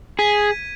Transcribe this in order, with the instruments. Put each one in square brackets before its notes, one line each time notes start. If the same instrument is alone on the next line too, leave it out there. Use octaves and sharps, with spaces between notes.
[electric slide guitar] G#4 [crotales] G#6 B6 D#7